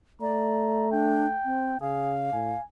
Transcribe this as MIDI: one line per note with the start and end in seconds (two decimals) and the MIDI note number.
0.21 1.37 57
0.21 0.91 74
0.21 0.88 82
0.92 1.27 62
0.92 1.78 79
1.45 1.80 60
1.81 2.30 49
1.81 2.15 68
1.81 2.60 77
2.33 2.55 45
2.33 2.64 80